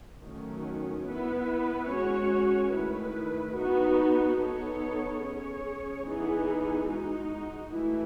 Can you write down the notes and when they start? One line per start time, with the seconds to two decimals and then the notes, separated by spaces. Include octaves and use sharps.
0.23 D#3 F#3 A3 C#4
1.07 B3 E4 B4
1.89 G#3 C#4 F#4 C#5
2.73 D#3 A3 E4 B4
3.56 B3 D#4 F#4
4.39 B3 D#4 A4 C#5
5.23 C#4 G#4 C#5
6.06 E3 B3 D#4 G#4
6.90 G#3 D#4 F#4
7.73 E3 A3 E4